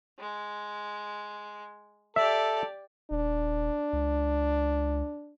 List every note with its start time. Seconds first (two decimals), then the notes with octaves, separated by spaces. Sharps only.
0.20 G#3
2.16 G4 A4 D5 E5
3.11 D#1 D4
3.93 C#2